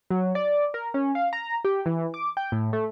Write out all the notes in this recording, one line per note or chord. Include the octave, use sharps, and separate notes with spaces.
F#3
D5
A#4
C#4
F5
A#5
G4
E3
D6
G5
A2
A3